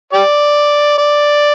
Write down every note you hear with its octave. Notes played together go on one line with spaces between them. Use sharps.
G4 D5
D5